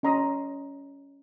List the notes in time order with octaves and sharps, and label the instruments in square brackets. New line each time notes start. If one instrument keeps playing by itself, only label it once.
[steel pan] C#4 D#5 A#5 C6 D#6